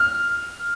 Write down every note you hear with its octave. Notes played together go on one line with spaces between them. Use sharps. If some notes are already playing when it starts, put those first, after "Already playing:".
Already playing: F6